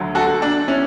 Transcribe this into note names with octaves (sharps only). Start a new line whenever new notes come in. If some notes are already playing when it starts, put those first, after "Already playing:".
Already playing: D2 D3 F#3
F#4 A4
D4
C#4 E4